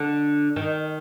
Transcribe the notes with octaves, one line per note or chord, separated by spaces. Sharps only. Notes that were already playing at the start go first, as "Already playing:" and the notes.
Already playing: D3
D#3